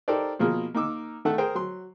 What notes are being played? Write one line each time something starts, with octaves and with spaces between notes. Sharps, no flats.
D#4 G4 A4 A#4 C5 D5
B2 F3 A#3 G#4
A#3 D#4 D6 E6
D#3 A3 A4 F#5
G#4 A#4 C5 G5
F#3 C6